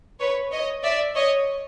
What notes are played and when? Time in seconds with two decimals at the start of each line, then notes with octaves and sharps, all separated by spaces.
0.19 B4 C#5
0.51 C#5 D#5
0.83 D5 E5
1.16 C#5 D#5